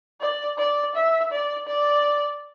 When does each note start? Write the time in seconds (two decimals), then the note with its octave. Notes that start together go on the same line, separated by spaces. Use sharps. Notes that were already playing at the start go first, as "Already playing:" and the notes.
0.21 D5
0.58 D5
0.95 E5
1.31 D5
1.67 D5